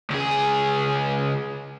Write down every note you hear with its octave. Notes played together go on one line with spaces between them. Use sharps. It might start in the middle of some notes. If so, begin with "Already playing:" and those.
C#2 G#4